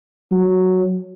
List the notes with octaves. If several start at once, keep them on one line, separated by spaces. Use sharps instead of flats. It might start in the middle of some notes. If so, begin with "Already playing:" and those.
F#3